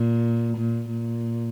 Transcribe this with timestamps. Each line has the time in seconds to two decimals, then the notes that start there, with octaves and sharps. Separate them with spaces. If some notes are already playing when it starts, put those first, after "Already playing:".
Already playing: A#2
0.57 A#2
0.91 A#2